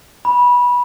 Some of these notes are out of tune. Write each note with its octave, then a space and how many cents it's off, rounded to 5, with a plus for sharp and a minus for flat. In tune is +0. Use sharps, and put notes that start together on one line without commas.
B5 -20